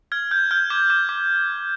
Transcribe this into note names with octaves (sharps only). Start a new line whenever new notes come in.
F6 G#6
F6 G6
F6 G6
D6 G#6
D6
D6